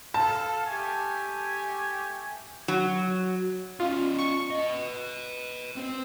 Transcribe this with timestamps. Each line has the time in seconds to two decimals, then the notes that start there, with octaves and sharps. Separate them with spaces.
0.14 A4 F5 A5
0.66 A3 G4 G#5
2.68 F#3
3.80 C#4 D#4 F4
4.18 C#6
4.50 B4 D#5
5.77 C4 C5